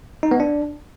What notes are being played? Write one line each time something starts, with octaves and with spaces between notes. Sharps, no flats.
D#4
B3
D4